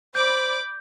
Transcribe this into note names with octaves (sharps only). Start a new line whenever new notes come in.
C5 D5 B5 D6 G6